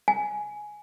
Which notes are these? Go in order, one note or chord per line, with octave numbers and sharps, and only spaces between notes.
G#5